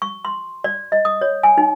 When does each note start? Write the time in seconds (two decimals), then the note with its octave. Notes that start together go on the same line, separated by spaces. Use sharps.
0.02 C#6
0.25 C6
0.64 D5
0.92 D#5
1.05 D#6
1.21 C#5
1.43 G#5
1.58 D#4